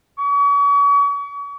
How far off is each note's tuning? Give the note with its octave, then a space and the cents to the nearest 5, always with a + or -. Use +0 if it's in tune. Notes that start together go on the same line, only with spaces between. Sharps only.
C#6 +40